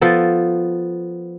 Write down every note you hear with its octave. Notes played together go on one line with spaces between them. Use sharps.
F3 B3 A4